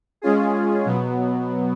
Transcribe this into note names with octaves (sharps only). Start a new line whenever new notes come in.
G#3 C#4 F4 G#4
B2 F#3 B3